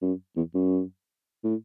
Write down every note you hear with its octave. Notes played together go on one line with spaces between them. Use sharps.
F#2
E2
F#2
A2